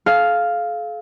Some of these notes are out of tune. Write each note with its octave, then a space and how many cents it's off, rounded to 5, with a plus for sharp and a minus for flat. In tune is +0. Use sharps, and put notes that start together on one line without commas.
A4 -45 F5 +0